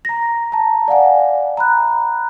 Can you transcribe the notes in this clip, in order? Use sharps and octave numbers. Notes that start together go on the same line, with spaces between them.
A#5 A#6
A5 A#5
D5 F5 F#5 G#5
A#5 B5 F#6